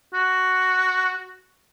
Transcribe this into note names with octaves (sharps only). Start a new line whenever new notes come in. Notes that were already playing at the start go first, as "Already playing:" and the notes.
F#4